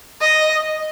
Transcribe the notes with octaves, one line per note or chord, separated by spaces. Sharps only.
D#5